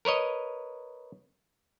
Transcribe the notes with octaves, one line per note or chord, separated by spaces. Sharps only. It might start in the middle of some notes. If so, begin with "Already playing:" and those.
A#4 B4 C#5 D#5